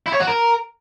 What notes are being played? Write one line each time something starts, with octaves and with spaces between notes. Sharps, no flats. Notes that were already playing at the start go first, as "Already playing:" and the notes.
E4
C#5
F#4
A#4